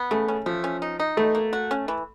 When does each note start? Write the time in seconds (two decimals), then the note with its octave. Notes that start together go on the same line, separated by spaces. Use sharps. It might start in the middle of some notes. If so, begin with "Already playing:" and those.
Already playing: B3
0.11 C#3 A3
0.28 C#4
0.46 F3 A3
0.64 C#4
0.82 D#4
1.00 D#4
1.17 B2 A3
1.35 A#3
1.53 F#4
1.71 C#4
1.88 E3